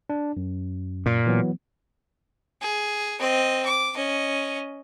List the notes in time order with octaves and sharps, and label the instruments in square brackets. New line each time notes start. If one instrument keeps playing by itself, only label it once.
[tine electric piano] D4
F#2
[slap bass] A#2
[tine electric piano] E3 F#3 B3
[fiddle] G#4
C4 D#5
D6
C#4 D#5